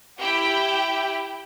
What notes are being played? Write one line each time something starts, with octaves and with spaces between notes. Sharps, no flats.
E4 G4 G5